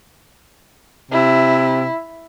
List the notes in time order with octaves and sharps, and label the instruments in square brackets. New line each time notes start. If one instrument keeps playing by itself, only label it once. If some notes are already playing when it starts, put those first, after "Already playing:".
[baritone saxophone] C3 [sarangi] E4